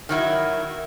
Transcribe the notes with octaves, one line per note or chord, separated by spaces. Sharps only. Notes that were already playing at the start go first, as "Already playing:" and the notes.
D#3 F#3 E4